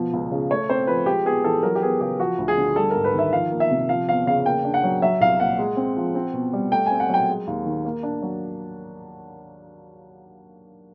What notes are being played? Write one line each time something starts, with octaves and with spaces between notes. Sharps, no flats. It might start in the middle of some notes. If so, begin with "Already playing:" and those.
Already playing: B2 F3
C#2
C#3
A3 C#5
C4 C5
F3 B4
G#3 G4
B3 G#4
E3 A4
F#3 A#4
G4
B3 G#4
C#3 G4
F3 F#4
D2
G#4
D3
G3 A4
G#2 A#4
B4
D#3 E5
F3 F5
A#3
E5
C3
F3 F5
E2 F5
C#3 F5
A#3 G5
D4
F#5
F#3
F#3 E5
C2 F5
A#2 F#5
G#3
C4
F3
C4
B2
G3
A3 G5
C4 G#5
F#5
F#3 G5
G#3
D#2
D#3
A#3
D4
F#3